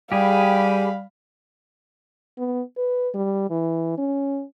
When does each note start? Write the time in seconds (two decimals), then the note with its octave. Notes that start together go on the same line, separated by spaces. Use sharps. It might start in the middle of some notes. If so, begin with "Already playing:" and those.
0.12 G3 G4 G#4 F5 B5
2.38 B3
2.77 B4
3.14 G3
3.50 E3
3.98 C#4